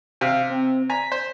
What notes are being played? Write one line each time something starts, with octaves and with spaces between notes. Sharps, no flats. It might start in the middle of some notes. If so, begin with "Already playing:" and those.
C3 F5
C4
G#5 A#5 B6
C5